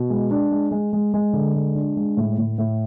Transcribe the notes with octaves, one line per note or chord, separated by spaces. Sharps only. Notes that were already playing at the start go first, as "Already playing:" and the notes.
Already playing: B2
G#3
D4
G#3
G#3
G#3
G#3
D3
G#3
D4
G#3
A2
A2
A2